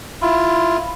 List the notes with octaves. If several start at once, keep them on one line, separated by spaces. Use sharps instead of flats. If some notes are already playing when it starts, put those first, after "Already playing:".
E4 F4